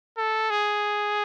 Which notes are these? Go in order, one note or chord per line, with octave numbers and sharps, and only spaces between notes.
A4
G#4